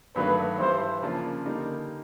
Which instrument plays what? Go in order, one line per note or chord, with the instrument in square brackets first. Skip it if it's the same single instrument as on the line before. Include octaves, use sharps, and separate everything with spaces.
[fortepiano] G2 D#3 F#3 A3 D4 [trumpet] B4
[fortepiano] G2 E3 G3 [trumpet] C5
[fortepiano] C#3 F3 A#3 D4 F4
D3 G3 A#3 D#4